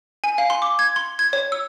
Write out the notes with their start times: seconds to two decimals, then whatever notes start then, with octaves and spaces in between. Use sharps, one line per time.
0.24 G#5
0.38 F5
0.50 C6
0.62 D6
0.79 G#6
0.96 C6
1.19 G#6
1.33 C#5
1.52 E6